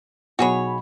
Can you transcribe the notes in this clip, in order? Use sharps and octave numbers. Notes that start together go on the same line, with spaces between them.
B1 F#4 G#4 C#5 B5